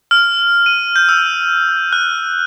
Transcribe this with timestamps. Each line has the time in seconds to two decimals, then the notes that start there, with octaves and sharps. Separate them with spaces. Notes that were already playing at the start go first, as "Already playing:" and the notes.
0.11 F6
0.66 D#7
0.96 G6
1.09 E6
1.93 F#6